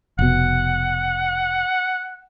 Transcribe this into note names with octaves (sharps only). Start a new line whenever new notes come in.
F1 B2 F#5